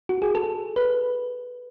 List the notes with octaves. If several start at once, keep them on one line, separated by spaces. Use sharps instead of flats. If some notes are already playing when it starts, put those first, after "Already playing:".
F#4
G#4
A4
B4